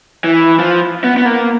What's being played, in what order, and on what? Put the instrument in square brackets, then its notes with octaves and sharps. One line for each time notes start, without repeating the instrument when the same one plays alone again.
[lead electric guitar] E3
F3
B3
B3
A#3